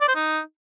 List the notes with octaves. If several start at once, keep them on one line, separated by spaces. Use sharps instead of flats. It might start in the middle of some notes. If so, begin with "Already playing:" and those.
D5
C5
D#4